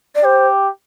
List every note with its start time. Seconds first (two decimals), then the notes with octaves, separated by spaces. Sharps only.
0.15 D5
0.24 G4 C5